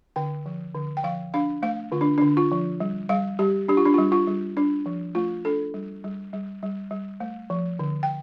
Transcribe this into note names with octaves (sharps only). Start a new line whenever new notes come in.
D3 G5
F3
D3
G5
F3 F5
D4 F5
A3 F5
D3 F4
D4
D3 D4
F4
F3
G3
G3 F5
G3 G4
D4 G4
F4
D4
G3 F4
F4
G3
D4
F3
A3 F4
D4 A4
G3
G3
G3
G3
G3
A3
F3
D3
G5